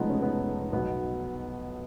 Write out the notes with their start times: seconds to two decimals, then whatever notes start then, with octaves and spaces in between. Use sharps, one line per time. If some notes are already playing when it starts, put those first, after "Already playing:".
Already playing: F1 F2 C#3 F3 G#3 B3 D#4
0.09 C#4
0.22 B3
0.73 B1 B2 F#3 B3